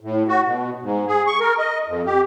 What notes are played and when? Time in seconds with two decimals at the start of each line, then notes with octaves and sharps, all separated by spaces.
0.01 A2
0.28 F#4
0.45 B2
0.82 G#2
1.07 G#4
1.27 C#6
1.40 A#4
1.58 D#5
1.87 F2
2.06 G4